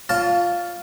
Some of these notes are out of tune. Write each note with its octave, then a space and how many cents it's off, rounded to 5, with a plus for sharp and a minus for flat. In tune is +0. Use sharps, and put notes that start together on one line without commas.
F4 +0 C#5 +30 A5 +0